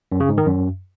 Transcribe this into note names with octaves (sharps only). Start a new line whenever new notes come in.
F#2
C#3
G#2
D#3
F#2